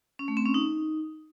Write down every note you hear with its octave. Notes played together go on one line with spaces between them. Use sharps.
C#4
A3
C4
C#4
D#4